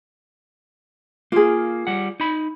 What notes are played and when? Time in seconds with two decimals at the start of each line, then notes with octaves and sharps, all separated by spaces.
1.32 A#3 F4 G#4
1.87 G3 F#5
2.20 D#4 B5